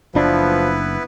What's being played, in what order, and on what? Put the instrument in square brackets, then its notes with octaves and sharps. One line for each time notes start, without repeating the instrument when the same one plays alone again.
[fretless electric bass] F#1 D4 [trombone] F3 [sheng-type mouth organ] B3 E4 B4